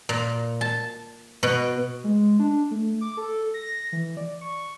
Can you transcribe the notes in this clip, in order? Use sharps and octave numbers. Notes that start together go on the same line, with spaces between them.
A#2
A5
B2
G#3
D4
A3
D6
A4
A#6
E3
D5
C#6